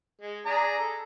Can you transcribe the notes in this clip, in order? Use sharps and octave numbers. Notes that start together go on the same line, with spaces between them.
G#3
D4 G#4 A#5
A4